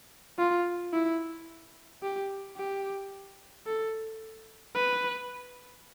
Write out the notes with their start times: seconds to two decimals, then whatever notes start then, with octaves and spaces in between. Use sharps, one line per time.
0.38 F4
0.93 E4
2.03 G4
2.57 G4
3.67 A4
4.75 B4